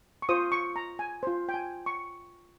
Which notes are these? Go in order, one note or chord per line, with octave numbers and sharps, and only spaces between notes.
C#6
F4 C5 D#6
C#6
A#5
G#5
F4 C5
G5
G#5
C#6